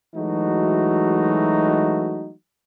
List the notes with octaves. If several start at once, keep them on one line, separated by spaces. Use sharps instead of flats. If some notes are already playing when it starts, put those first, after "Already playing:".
E3 F#3 G#3 A3 D#4 F#4